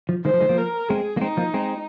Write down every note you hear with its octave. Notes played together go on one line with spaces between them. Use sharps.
F3
D#3 G#3 C5
F3
D#3 G#3
F3 A#3
A#4
G#3 C4 G#4
A#3
G#3 C4 D#4
F3 A#3
G#3 C4